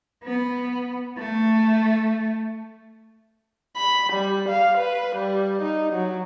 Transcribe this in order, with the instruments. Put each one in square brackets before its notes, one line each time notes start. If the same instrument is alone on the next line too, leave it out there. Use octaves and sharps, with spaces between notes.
[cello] B3
A3
[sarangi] B5
G3
F5
B4
G3
D#4
F#3